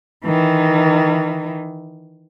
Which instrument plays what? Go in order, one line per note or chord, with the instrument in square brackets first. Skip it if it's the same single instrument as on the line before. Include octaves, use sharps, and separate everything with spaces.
[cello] D#3 E3